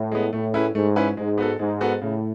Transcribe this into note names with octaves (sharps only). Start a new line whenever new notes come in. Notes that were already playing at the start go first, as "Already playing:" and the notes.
Already playing: A2
G#3 B3
A2 A3
C#4 E4 G#4 B4
G#2 A3
C#4 E4 G#4 B4
G#2 G#3
B3 F#4 A4
G#2 G#3
B3 F#4 A4
A2 C#3